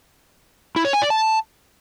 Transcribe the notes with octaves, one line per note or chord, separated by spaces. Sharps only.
E4
C#5
G#5
D5
A5